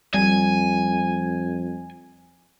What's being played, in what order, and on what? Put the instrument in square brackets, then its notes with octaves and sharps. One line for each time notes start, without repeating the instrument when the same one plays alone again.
[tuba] F2 [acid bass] G3 [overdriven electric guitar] G#5